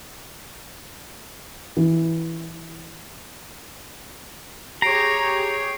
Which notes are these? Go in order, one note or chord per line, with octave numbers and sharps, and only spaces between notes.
E3
G4 G#4 C#5 A#5 C7 D7